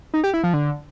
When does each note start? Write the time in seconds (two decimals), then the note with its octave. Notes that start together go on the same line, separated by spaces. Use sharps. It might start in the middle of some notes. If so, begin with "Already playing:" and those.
0.14 D#4
0.24 G4
0.34 E4
0.44 F3
0.54 D3